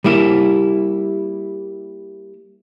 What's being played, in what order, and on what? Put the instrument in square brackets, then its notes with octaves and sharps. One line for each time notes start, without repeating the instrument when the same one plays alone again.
[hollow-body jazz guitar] G3 A#3 E4